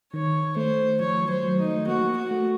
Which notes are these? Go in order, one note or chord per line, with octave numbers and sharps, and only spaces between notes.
D#3 C#5
A3 C5
F3 C#5
F#3
C5
F#3
D#4
A3
A#3 F#4
F#4
A3